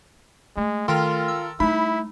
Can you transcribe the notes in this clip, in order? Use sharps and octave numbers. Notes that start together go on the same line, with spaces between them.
G#3 A3
D#3 F4 A4 A#4 G5 C6 F6
E6
G3 A3 D#4 E4 B5